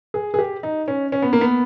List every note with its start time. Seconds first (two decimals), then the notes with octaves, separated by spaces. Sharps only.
0.14 G#4
0.34 G#4
0.39 G4
0.63 D#4
0.88 C#4
1.12 C#4
1.22 B3
1.33 A#3
1.41 B3